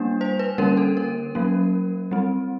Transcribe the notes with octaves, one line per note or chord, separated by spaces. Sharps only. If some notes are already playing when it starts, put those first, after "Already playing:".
Already playing: G3 A#3 D4
C5
B4
D3 G3 A#3 C#4 A#4
A4
A#4
F#3 A#3 C#4
G3 C4